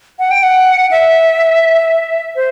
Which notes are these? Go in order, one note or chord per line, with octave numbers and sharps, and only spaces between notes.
F#5
G5
F#5
E5
C5